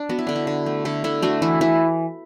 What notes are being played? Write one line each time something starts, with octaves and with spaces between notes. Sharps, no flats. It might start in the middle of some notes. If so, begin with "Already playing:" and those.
Already playing: D4
B3 F#4
E4
D3 D4
E4
D3
A3
D3 E4 A4
D3 E4 A4
A3 D4 F#4
E3 E4
E3 E4